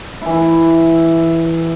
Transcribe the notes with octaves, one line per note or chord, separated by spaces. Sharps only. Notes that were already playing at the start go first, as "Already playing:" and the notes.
E3 E4